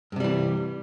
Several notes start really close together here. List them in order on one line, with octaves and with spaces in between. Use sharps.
G2 C3 G3 E3